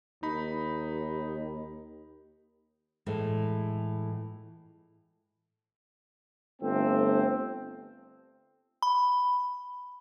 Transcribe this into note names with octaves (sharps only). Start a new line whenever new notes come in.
D#2 D#4 B5
A2 E3 G#3
G1 A3 C4
B5